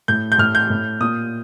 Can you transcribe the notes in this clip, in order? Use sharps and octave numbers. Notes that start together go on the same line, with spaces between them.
A2 G6
G6
A2 F6
G6
A2
A#2 D#6